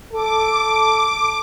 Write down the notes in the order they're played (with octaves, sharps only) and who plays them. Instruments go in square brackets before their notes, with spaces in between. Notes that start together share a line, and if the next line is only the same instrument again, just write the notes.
[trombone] A4 [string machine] D6